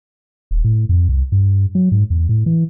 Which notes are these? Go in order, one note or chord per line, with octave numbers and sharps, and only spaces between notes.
D#1
A2
F2
C2
G2
F#3
G#2
E2
A2
E3